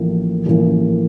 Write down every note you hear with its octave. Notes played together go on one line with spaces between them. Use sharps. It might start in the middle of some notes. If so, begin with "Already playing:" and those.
Already playing: A1 A2 F3 A#3
A1 A2 F3 A#3